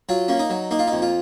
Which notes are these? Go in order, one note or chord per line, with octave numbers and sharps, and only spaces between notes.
F#3 F4
A#3 C#4
D#4
F#3
A#3 D#4
F4
D#4
F2
F4